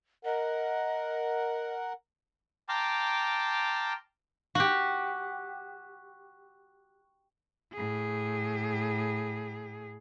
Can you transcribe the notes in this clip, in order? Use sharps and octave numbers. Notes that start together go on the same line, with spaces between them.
A#4 D#5 F#5
G5 A5 A#5 C6 D6 F6
F#4 G4
A2 G#4